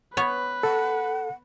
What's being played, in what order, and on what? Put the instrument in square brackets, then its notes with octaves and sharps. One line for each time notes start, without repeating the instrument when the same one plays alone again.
[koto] B3 C#5 [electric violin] B4
[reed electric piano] A4 [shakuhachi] F#5